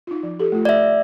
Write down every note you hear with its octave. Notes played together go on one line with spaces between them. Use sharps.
D#4 F4
F3
G4 A4
A3 F4
D5 E5